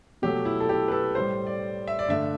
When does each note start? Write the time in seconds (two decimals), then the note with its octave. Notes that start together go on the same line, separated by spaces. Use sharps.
0.22 B2 F#3 A3 G4
0.45 E4
0.60 A4
0.69 G4
0.88 B4
0.92 A4
1.15 A2 G3 C5
1.47 D5
1.87 E5
1.99 D5
2.08 G2 D3 A3 E5